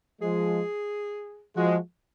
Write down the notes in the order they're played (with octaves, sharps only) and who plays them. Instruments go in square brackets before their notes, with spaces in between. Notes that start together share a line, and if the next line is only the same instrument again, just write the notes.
[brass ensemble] F3 G#3 [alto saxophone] G#4
[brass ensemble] F3 G#3 [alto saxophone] F#4